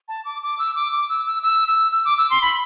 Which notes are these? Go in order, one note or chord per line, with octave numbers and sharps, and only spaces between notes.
A5
D6
D6
E6
D6
D6
E6
E6
E6
E6
E6
D6
E6
C6
B5